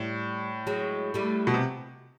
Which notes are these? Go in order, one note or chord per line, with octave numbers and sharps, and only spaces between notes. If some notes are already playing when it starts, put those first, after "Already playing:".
Already playing: A2 G3
F#3 G#3
G3 A3
B2
C3